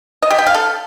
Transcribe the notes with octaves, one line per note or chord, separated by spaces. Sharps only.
D#5
G4
G5
F5
A4